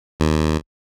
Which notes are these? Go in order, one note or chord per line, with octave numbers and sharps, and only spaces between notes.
D#2